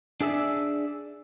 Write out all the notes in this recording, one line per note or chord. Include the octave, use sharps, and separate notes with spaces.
D4 G#4 D5 E5